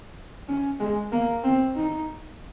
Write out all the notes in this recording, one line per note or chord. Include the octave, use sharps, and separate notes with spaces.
C#4
G#3
A#3
C4
D#4